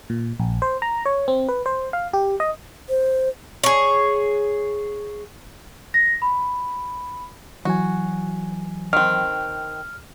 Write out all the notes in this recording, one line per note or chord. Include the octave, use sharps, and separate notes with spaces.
A#2
A#1
C5
A#5
C#5
C4
B4
C5
F5
G4
D#5
C5
G#4 C#5
A#6
B5
E3 F#3 F#4 G#5
D#3 C4 F6